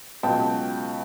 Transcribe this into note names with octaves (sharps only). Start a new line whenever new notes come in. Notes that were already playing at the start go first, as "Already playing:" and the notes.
C#2 B2 F#3 G5 A5